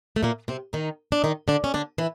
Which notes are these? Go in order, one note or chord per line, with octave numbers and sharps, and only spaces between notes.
A3
A#2 A#3
C3 C4
D#3 D#4
D4
D#3 D#4
D3 D4
C#4
D3 D4
E3 E4